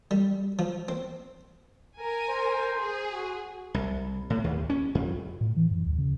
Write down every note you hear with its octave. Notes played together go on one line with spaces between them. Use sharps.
G3
F3
C4
A#4 G#5
C5
G#4
F#4
C2
A2
D#2
C#4
F2
A2
E3
F#2
D#2
C#3